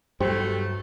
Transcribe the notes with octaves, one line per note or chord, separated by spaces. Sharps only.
G2 B2 F#3 A3 G4 C5